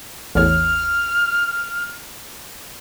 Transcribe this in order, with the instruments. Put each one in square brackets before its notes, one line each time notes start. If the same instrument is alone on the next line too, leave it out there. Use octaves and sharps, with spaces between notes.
[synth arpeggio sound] A1 E2 C#5 [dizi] F6